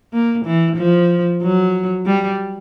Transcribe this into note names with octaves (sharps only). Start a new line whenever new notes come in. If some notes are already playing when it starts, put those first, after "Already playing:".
A#3
E3
F3
F#3
G3